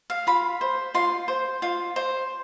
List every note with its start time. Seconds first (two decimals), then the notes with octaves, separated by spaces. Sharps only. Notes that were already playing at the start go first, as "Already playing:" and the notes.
0.10 F5
0.27 F4 B5
0.61 C5
0.94 F4 C6
1.28 C5
1.62 F4
1.96 C5